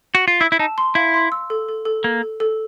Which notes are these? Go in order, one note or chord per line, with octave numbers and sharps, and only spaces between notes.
F#4
F4
E4 E6
E4
D#4 A5
C6
E4 F5
C6
E6
A4
A4
A4
A#3 A4
A4
A4